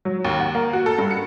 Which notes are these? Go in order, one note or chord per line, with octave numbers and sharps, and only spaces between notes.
F#3
D#2
F#5
A#3
F#4
A4
G2
C#7